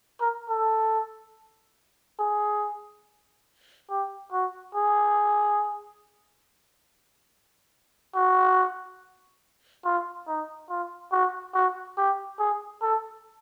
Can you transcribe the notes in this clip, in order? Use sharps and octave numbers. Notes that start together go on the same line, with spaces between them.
A#4
A4
G#4
G4
F#4
G#4
F#4
F4
D#4
F4
F#4
F#4
G4
G#4
A4